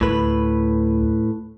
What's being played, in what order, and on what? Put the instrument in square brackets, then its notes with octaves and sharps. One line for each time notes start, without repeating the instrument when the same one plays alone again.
[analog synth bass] D2 [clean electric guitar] A2 B4